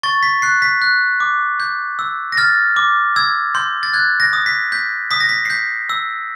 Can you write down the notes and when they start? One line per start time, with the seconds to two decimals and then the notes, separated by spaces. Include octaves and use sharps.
0.03 C#6 A6
0.23 B6
0.42 F#6 C7
0.62 B6
0.82 F#6
1.20 D6
1.60 G6
1.99 E6
2.32 A#6
2.37 F6 A6
2.76 D6
3.16 E6 G#6
3.55 C6 G6
3.83 A6
3.93 F#6 G#6
4.20 A#6
4.33 D#6
4.46 B6
4.72 G6 B6
5.11 D#6 B6
5.20 A#6
5.29 B6
5.45 C7
5.50 G6 B6
5.90 E6